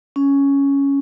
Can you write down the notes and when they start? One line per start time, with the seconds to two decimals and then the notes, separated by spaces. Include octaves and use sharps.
0.16 C#4